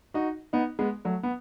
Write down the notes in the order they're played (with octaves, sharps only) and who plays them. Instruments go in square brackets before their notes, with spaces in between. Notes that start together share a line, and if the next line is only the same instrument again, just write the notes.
[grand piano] D#4 F#4
B3 D#4
G#3 B3
F#3 A3
B3